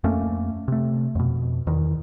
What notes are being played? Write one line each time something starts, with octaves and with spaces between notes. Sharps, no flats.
F2 A3 A#3 C#4
C3 A3
F2 B2
E2 D#3